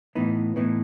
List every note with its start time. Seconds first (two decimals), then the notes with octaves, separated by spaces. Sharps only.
0.15 A2 E3 B3 D#4
0.56 A2 E3 B3 D#4